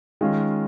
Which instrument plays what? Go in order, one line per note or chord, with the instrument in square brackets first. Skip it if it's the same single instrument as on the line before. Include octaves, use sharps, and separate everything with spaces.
[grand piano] D#3 G#3 C#4 F4